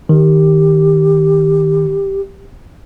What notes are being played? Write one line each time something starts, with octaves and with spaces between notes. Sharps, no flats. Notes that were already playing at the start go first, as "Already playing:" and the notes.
D#3 G4